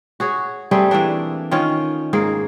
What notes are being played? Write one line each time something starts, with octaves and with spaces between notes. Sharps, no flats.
F#4 G#4 C#5
G3 A3 C4 G#4
E3 A3 A#3 D4
D#3 C#4 F4 C#5
G#2 A#3 G#4